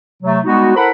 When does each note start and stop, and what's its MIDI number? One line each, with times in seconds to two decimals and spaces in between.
0.23 0.39 48
0.23 0.39 54
0.23 0.39 57
0.44 0.71 55
0.44 0.71 56
0.44 0.71 59
0.44 0.71 63
0.44 0.71 66
0.75 0.89 64
0.75 0.89 69
0.75 0.89 70
0.75 0.89 72
0.75 0.89 78
0.75 0.89 83